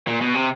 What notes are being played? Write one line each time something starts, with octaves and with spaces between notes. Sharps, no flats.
A#2
B2
C3